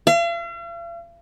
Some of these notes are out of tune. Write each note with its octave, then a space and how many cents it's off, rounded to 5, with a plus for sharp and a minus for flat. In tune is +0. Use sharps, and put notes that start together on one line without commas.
F5 -45